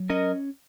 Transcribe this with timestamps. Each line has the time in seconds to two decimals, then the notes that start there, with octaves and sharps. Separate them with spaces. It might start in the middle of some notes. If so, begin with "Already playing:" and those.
Already playing: F#3
0.10 C#4 A#4 D#5